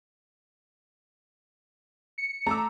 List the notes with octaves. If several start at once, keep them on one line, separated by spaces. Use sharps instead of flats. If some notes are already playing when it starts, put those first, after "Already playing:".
C#7
A3 A#5 D6 E6